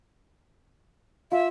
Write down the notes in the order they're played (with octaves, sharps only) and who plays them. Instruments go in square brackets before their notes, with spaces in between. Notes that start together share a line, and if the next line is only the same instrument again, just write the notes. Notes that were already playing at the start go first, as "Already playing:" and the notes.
[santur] F4 [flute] E5